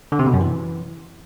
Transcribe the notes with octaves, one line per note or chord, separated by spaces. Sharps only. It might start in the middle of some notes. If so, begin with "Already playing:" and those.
D3
C3
B2
F#2
E3